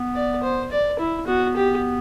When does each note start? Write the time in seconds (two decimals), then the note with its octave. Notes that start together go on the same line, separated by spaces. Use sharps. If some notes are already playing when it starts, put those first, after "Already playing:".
Already playing: B3
0.15 D5
0.43 C5
0.71 D5
0.99 E4
1.27 B3 F#4
1.56 G4